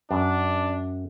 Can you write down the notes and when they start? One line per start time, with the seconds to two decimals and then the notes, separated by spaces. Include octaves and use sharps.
0.11 F#2 D4